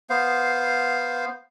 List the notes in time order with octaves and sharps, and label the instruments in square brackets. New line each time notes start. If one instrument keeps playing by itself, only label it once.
[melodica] B3 C5 F5